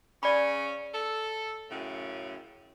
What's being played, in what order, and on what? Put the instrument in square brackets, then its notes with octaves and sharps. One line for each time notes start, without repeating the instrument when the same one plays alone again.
[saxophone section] C#3 C#4 [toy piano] D5 B5
[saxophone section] A4
F#2 A2 C#3